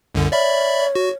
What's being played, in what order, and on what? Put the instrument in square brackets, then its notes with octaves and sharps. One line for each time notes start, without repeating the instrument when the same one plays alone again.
[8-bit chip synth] C2 F#2 D3
[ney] C#5 [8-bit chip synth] D5 E5 B5
[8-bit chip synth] F#4